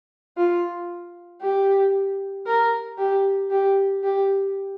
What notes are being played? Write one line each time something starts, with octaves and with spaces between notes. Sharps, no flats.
F4
G4
A#4
G4
G4
G4